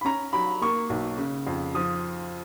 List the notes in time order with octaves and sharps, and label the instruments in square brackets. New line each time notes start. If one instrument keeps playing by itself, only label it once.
[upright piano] B5
C#4 A#5
F#3 B5
A#3 C#6
B1
C#3
F2
F3 D#6